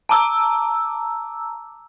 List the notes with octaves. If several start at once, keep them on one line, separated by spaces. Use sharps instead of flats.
A5 A#5 D6 E6